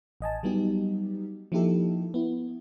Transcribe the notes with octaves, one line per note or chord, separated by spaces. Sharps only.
A1 D#5 G#5 A5
F#3 G3 B3 D#4 G4
F3 A#3 D#4 E4 G4 A4
B3 E4